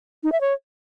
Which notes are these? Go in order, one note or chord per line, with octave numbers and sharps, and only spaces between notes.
D#4
E5
C#5